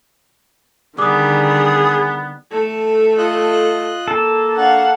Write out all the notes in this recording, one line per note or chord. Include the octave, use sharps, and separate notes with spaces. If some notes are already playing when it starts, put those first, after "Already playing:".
D3 D#3 G3 B3 G#4 D6 D#6
A3 A4
F4 D#5 F#6
A#3 A4
D4 F5 F#5 C#6